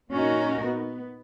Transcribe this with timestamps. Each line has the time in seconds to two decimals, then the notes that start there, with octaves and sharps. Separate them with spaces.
0.11 A#2 C#4 D#4 F#4 A#4
0.66 B3